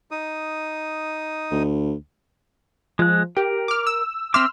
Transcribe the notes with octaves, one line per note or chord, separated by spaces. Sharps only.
D#4 D#6
D2
F3 G#3 F#6
G4 A#4
D6 F6
E6
C4 E5 C6 D6 E6 F6